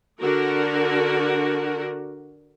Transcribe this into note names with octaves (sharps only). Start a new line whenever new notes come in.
D3 F#4 A#4